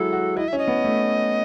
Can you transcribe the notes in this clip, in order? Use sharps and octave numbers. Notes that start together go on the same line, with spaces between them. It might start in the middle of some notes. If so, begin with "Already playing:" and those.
Already playing: F#3 G#3 E4 F#4 A4
F#4
E4 D#5
C#4 E5
D#5
B3
A3